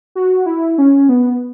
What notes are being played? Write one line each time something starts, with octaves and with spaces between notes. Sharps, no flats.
F#4
E4
C#4
B3